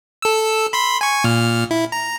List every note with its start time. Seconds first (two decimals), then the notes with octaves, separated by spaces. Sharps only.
0.22 A4 E6
0.73 B5 C6 B6
1.01 G#5 C#6
1.24 A#2 F6
1.71 E4
1.92 A#5